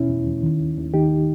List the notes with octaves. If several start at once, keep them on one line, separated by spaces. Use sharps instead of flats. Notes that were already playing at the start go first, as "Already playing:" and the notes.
Already playing: D#2 B2 C#4 E4
E2
E2
D#3
D#2
D#2
D#3 D#4 G4